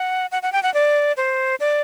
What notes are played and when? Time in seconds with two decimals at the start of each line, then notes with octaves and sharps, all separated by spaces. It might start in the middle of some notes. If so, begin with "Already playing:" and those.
Already playing: F#5
0.32 F#5
0.42 F#5
0.52 G5
0.63 F#5
0.74 D5
1.17 C5
1.60 D5